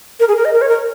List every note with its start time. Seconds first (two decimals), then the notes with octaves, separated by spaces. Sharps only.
0.20 A#4
0.28 G#4
0.37 A#4
0.45 D#5
0.54 A#4
0.62 C#5
0.69 A#4